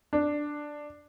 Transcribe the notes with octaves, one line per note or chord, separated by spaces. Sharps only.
D4